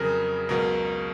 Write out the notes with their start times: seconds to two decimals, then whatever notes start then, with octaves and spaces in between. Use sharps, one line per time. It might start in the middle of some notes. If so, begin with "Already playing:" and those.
Already playing: F2 C#3 F#3 G#4 A#4
0.49 C#2 B2 F#3 A#4